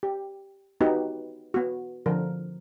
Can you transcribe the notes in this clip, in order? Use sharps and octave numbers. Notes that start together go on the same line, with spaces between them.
G4
B3 D#4 F#4 G4 B4
B3 F#4
D3 F3 A#4